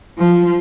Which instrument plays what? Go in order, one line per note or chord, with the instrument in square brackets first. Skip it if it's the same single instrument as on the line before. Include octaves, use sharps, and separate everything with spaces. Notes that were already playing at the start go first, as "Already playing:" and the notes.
[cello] F3